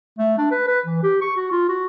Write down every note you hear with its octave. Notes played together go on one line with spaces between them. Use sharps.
A3
D4
B4
B4
E3
G4
C#6
F#4
F4
F#4